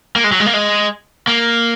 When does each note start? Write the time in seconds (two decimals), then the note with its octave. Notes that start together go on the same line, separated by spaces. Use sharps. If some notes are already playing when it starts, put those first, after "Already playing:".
0.16 A#3
0.24 G#3
0.32 F#3
0.40 G#3
0.46 A#3
0.54 G#3
1.27 A#3